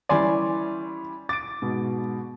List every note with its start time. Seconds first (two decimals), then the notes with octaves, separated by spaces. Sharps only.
0.09 E3 G3 C#4 D5 G#5 C6
1.29 D6 A6 D7
1.62 G#2 B2